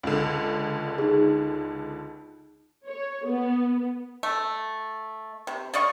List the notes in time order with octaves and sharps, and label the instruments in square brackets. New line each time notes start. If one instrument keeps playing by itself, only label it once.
[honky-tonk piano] C#2 D3
[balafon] D#4 G#4
[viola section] C#5
B3
[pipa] A3
C3
D5 D#5 F5 C#6